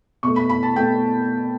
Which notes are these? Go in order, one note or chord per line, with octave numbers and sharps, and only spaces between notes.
B2 A3 C#6
B5
B5
A5
B2 A3 G5